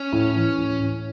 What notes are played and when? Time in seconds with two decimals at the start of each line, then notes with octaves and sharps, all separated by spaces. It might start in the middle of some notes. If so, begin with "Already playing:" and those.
Already playing: C#4
0.12 A2
0.35 E3
0.57 A2
0.80 A2